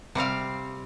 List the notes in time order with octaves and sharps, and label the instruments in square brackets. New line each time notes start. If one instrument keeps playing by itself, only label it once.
[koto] C3 G3 C4 F5